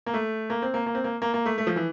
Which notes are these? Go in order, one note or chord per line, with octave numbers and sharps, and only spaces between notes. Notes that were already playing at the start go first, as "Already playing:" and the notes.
A#3
A3
A#3
C4
A#3
A#3
C4
A#3
A#3
A#3
A3
A3
F3
E3